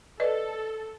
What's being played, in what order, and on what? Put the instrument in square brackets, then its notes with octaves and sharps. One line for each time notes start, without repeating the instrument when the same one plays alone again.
[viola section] A4 [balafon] B4 D5 D#5